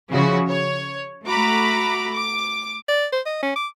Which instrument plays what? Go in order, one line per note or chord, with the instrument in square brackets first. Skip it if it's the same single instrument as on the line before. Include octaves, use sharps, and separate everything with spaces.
[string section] C#3 F3 E4 F#4
C#5
A3 F#4 A#5 B5 D6
D6
[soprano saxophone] D5
C5
D#5
C#4
D6